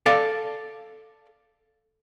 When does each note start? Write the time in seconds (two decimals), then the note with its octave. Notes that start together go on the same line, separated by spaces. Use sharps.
0.06 A4 D5 F5 A5